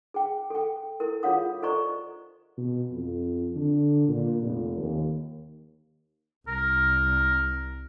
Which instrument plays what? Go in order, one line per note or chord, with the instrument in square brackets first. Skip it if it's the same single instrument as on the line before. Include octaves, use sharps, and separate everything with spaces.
[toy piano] G#4 G5
A4 G5
E4 A4 A#4
F4 G#4 C#5 F5 F#5 D#6
A4 C5 D5 D#5 A#5 C#6
[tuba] B2
F2
D3
A#2
F1
D#2
[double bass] C2 [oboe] A#4